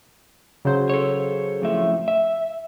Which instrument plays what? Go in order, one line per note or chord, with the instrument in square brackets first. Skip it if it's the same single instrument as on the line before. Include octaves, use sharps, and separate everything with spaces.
[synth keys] C#3 F#3 C5
[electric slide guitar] A4 C#5
F2 A2 E5
E5